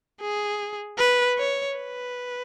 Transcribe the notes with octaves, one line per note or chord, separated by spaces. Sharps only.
G#4
B4
C#5
B4